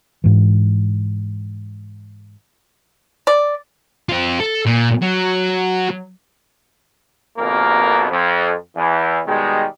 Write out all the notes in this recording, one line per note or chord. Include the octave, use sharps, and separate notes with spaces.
G#2 E3
D5
C4 F4
A4
A#2
F#3
G#1 F2 B2 A#3 A#4
F2
E2 E3
B2 D#3 G3 G#3